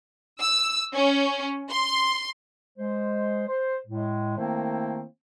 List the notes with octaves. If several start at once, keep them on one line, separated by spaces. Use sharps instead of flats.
E6
C#4
C6
G#3 C5
C5
A2 G#3
D#3 A3 A#3 C4 E4 C5